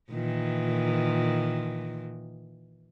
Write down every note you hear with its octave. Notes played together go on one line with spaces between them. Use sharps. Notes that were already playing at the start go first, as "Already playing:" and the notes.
A#2 D#3 E3